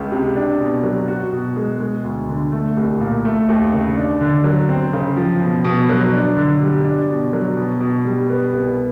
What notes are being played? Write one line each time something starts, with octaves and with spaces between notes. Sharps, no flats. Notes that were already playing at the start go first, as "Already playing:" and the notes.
Already playing: C#2 C#3 G#3
C3
D4
B2
F#3
F#4
B2
G#3
G#3
D2
D3
A3
C2
A#2
A3
D#2
C#3
D4
D3
F#3
C4
C#3
F3
B2
B2
F#3
D4
D3
G3
D4
B2
F#3
B2
B2
G3
B3
C2